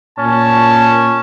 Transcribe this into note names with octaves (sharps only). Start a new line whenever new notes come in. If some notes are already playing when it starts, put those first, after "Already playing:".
A#2 C#4 A5